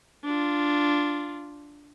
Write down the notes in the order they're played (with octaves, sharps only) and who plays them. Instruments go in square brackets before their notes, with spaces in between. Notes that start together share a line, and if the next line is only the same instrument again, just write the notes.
[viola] D4 F4